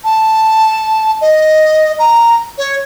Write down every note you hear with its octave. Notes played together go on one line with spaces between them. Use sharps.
A5
D#5
A#5
C#5